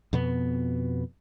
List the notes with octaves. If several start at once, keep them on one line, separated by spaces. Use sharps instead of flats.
F2 B2 B3